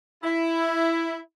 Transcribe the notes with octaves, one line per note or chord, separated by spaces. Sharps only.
E4